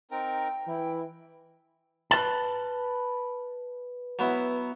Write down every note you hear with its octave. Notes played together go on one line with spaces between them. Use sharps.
C4 D#4 A#4 G5
E3 E4
B4 A5
F#3 B3 E4